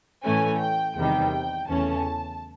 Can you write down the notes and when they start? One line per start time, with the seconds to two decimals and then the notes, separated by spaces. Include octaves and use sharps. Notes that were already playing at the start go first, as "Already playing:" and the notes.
0.23 A2 E3 A3 C#4 G#5
0.60 G5
0.96 E2 C3 D#3 G3 G5
1.68 E2 C#3 E3 A3 C#4 A5